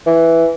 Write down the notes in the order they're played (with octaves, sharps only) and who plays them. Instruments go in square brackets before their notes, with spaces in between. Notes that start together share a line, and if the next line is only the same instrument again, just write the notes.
[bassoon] E3